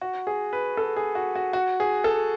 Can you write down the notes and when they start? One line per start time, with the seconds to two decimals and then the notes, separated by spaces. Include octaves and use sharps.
0.01 F#4
0.27 G#4
0.53 B4
0.77 A4
0.96 G#4
1.15 F#4
1.36 F#4
1.53 F#4
1.80 G#4
2.04 A4